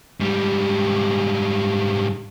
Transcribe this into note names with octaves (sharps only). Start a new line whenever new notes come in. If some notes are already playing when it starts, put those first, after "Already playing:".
G#2 G3